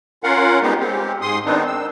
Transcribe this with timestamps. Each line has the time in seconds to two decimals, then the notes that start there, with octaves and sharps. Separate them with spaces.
0.24 C#4 F4 A#4 F5 F#5
0.63 G3 G#3 B3 D#4 G4
0.80 G#3 C4 G4
1.21 G#2 G#3 C6 D#6
1.46 D#3 B3 C4 D4 D#4
1.67 E6